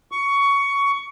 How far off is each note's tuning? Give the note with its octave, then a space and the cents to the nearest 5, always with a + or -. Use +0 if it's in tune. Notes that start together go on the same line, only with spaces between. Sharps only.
C#6 +15